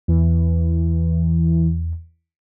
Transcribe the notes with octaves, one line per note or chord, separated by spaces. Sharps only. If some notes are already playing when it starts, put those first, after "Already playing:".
E2 E3